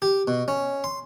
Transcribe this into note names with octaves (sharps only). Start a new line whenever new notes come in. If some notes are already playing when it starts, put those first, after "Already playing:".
G4
B2
C#4
C6